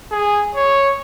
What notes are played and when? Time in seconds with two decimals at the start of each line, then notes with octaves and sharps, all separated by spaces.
0.11 G#4
0.55 C#5